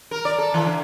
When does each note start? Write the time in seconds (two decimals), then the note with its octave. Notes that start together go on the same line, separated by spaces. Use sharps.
0.11 A#4
0.25 D5
0.38 A4
0.54 E3
0.66 D3